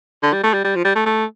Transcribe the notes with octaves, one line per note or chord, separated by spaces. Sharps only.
D3
G3
A3
G3
G3
F3
G3
A3
A3